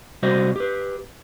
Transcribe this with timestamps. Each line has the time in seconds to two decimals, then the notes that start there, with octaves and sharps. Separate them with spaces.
0.22 C3 G3 F#4 C5 D#5
0.56 G4 B4